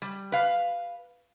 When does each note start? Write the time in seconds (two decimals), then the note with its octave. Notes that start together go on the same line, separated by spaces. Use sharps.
0.02 G3
0.32 B4 F5